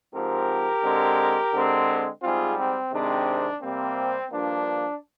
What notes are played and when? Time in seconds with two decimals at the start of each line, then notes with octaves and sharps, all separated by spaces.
0.13 G#2 F3 C4 G4 A#4
0.83 D3 G#3 C4
1.53 D3 G#3 C4
2.22 G#2 G3 C4 F4 G#4
2.57 C4
2.92 C3 D#3 G#3 C4 D4
3.62 C3 G3 A#3 C4
4.32 G2 F3 A#3 D4